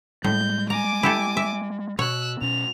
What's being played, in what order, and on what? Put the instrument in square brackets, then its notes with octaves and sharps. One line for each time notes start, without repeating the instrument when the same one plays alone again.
[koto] A2 [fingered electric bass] G3 G#3 [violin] G6
[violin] G#5 D6 [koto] A#5
[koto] E4 G4 A4
E5
[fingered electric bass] B2 [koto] C#5 [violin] E6 F#6
[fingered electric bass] B2 C#4 [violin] F7